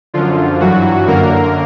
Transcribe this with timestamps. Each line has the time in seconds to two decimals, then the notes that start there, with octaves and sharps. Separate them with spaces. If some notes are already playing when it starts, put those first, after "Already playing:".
0.14 F#2 D3 F3 F4
0.60 G2 E3 F#3 F#4
1.07 F#2 D3 A#3 A#4